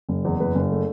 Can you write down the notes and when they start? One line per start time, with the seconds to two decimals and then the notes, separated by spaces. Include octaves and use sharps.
0.09 F#1
0.25 E2
0.40 F#1 B4
0.55 F#1
0.72 A3